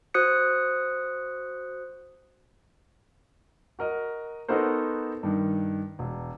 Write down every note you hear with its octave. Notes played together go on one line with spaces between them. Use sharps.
F#4 C5 D#6 F#6 C#7
F#4 A#4 D#5
B3 D#4 F#4 A4 A#4 C5
G2 D#3
E1